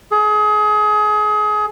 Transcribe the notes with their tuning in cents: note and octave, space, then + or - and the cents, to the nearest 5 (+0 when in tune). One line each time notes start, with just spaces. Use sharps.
G#4 +30